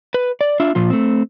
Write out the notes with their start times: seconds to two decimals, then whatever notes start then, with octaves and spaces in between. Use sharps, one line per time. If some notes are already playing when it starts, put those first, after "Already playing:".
0.14 B4
0.41 D5
0.60 D4 F4 E5
0.75 A#2 F3 F4
0.90 A3 C4